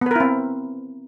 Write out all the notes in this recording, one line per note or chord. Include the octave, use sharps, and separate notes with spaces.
B3 C4 E4 A#4 B4